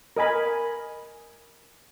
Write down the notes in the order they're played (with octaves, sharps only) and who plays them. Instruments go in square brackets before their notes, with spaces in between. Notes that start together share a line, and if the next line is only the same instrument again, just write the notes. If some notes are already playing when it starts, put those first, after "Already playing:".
[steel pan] A#4 D#5 G#5 B5